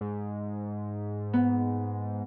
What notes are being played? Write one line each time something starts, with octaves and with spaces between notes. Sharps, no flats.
G#2
B3